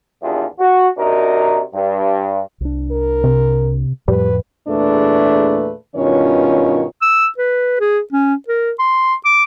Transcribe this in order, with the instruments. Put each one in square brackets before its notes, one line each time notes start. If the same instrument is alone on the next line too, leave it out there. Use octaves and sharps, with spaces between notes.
[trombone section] G#1 E2 D4 F4 G4 G#4
F#4
C3 D4 D#4 F#4 A#4
G2
[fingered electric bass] C2 D4
[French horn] A#4
[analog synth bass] C3
[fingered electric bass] F2 A2 F3 [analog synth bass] G3 [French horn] B4
[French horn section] E2 A#2 A3 D4 G#4 B4
G2 B2 D#3 C#4 F4 C#5
[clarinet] E6
B4
G#4
C#4
A#4
C6
D6